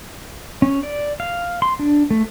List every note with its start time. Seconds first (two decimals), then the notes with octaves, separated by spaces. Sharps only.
0.62 C#4
0.83 D5
1.20 F5
1.62 C6
1.79 D4
2.11 A3